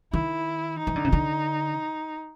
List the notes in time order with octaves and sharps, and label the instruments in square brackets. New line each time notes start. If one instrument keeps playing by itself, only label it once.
[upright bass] D#3 [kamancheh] E4
[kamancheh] D#4
[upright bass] E3
D3
C#3
D3